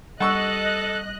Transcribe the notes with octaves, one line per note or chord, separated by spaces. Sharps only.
G3 A4 D#5 F#5 C#6 E6 F#6